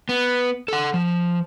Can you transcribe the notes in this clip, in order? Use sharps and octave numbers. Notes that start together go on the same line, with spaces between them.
B3
A4 F#5
F3